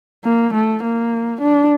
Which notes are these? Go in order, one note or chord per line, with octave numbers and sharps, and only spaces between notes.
A#3
A3
A#3
D4